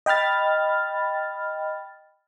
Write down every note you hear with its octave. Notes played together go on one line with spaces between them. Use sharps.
D#5 G5 B5 F6 A6